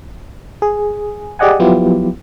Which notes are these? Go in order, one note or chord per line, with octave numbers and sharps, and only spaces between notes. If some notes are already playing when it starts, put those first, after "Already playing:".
G#4
G4 G#4 D5 D#5 F#5 G#5
F3 F#3 B3 E4 F4 G4